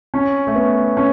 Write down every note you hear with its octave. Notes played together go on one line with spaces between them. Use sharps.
C#4
A3
B3
C#4